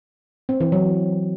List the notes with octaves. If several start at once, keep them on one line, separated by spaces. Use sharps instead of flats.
C4
E3
F#3